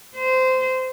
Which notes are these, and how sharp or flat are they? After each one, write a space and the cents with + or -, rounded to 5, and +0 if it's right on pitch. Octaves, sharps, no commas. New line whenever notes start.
C5 -20